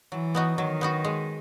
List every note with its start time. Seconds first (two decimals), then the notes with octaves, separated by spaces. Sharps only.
0.12 E3 F#3
0.35 B3 D#4 F#4
0.58 D#3 F#3
0.81 B3 D#4 F#4
1.04 G#3